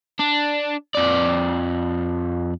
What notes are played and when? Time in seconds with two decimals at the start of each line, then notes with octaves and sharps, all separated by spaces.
0.20 D4
0.95 F2 D5